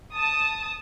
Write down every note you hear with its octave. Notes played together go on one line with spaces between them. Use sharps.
A5 D#6